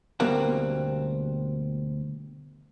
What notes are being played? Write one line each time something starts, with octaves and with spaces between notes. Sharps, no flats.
D2 B2 G3 A#3 C4 F#5